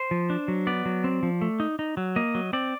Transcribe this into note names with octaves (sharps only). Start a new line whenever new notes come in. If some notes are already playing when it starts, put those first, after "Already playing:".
Already playing: C5
F3
D4
F#3
B3 D5
F#3
C4
F3
A3
D#4
D#4
F#3
A#3 D#5
F#3
C4 D5